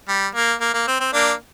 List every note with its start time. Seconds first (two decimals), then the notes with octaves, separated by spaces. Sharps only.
0.08 G3
0.35 A#3
0.61 A#3
0.74 A#3
0.88 C4
1.00 C4
1.13 A#3 D4